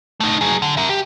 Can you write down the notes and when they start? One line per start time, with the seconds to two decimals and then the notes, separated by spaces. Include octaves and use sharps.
0.20 A3 D#4
0.41 F#3 G#4
0.62 D3
0.77 A#4 E5
0.89 G4